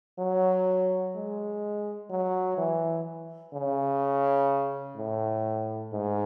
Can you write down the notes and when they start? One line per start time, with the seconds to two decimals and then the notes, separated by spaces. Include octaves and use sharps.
0.19 F#3
1.15 G#3
2.10 F#3
2.58 E3
3.53 C#3
4.96 A2
5.92 G#2